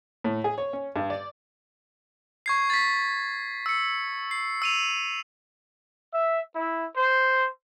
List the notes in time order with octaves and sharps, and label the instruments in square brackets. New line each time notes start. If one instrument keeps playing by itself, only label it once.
[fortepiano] A2
G#4
C#5
C#4
G2
D5
[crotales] C#6 G#6 C7
A6 B6
E6 C#7
C7
E6 D#7 F7
[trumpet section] E5
E4
C5